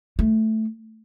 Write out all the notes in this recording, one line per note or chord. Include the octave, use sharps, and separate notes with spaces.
A3